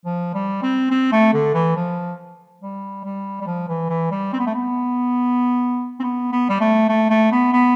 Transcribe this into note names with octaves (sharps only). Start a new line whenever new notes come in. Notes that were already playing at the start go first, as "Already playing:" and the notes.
F3
G3
C4
C4
A3
D3
E3
F3
G3
G3
G3
F3
E3
E3
G3
C4
B3
A3
B3
C4
B3
B3
G3
A3
A3
A3
B3
B3